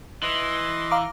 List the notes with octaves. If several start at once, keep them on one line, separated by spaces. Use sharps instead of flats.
E3 D#5 C6
F5 A#5 D6